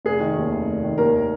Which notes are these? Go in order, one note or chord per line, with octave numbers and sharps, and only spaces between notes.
F1 G#4
D#3
D#2
F1
F1
D#3
D#2 A#4